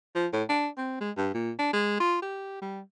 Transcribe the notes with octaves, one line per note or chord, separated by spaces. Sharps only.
F3
A2
D4
C4
G#3
G2
A#2
D4
G#3
F4
G4
G3